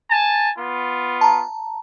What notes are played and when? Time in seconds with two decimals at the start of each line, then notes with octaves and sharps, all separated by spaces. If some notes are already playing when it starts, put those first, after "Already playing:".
0.11 G#5 A5
0.57 B3 F4
1.21 A5 A#5